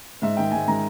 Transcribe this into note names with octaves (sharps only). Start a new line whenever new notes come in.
G#2 E5
D#3 G#3 G5
G#2 G#5
D#3 G#3 A#5